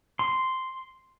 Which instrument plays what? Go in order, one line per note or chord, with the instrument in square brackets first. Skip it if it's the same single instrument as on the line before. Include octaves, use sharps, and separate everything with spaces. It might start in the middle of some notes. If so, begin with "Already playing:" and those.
[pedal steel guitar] C6